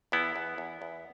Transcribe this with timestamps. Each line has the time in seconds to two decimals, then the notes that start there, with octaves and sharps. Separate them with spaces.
0.12 E2 B3 E4
0.36 E2
0.58 E2
0.82 E2